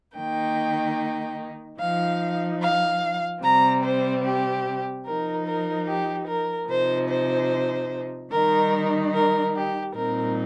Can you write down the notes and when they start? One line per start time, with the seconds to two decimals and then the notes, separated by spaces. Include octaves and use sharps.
0.16 D#3 A#3 D#4 G5
1.80 F3 D#4 F5
2.61 F5
3.43 C3 G3 C4 A#5
3.84 C5
4.24 G4
5.06 F3 D#4 A#4
5.46 A#4
5.87 G4
6.28 A#4
6.69 C3 F3 D#4 C5
7.10 C5
8.32 D#3 G3 D#4 A#4
9.13 A#4
9.55 G4
9.95 A#2 G3 C4 D#4 A#4